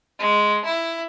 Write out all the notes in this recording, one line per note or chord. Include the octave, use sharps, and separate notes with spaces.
G#3
E4